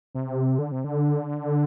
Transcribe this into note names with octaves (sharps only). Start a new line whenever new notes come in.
C3
D3
C3
D3